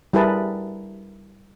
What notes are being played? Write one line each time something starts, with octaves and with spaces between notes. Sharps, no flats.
G3 E4 G#4 A#4 B4 A5